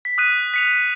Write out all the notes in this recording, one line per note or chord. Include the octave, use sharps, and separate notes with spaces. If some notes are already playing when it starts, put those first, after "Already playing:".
B6
D#6 F#6 D#7
B6 C#7 F7